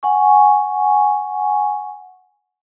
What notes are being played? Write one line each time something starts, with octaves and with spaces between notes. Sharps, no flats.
F#5 G#5 C#6